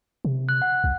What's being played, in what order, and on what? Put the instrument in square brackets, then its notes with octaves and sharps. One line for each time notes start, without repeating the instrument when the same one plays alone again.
[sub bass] C3
[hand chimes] F#6
F#5
[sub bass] C2